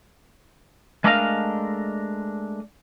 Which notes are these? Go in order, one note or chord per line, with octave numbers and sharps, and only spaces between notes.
G#3 A3 D4 A#4 D#5 F5